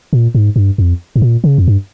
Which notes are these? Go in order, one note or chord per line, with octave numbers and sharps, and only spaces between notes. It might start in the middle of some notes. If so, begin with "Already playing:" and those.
A#2
G#2
G2
F2
G#2
A#2
C#3
F2
G2